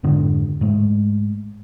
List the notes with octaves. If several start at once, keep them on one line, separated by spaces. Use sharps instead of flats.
F2 G#2 D3 D4
G#2 G#3 A3